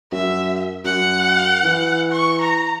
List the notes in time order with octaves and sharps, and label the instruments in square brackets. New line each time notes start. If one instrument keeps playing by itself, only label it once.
[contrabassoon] F#2 [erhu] E5
[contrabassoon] F#2 [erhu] F#5
[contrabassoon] E3
[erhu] C#6
A#5